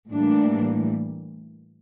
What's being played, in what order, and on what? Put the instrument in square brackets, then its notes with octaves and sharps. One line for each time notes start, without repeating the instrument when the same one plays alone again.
[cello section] A2 E3 G3 A#3 D4